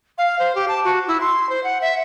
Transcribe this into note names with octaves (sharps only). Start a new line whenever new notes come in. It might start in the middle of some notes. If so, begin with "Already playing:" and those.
F5
C5
G4
A5
F#4
E4
C6
C5
F#5
E5